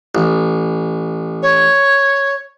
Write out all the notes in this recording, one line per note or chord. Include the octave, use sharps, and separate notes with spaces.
A1
C#5